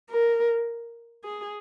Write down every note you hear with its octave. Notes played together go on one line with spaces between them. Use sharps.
A#4
G#4